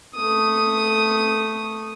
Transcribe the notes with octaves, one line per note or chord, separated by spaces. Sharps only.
A3 D#6